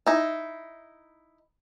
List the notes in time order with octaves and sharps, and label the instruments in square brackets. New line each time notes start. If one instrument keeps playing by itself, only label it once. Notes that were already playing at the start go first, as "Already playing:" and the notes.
[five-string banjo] D#4 E4